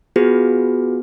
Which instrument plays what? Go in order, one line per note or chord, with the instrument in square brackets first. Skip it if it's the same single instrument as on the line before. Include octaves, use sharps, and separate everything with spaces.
[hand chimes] B3 F4 F#4 G#4 B4